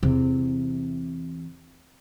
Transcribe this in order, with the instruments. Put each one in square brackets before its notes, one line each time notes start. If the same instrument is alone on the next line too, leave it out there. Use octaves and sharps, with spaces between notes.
[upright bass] E2 C3